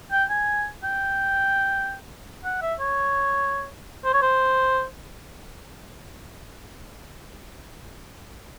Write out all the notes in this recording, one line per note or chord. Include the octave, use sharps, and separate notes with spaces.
G5
G#5
G5
F#5
E5
C#5
C5
C#5
C5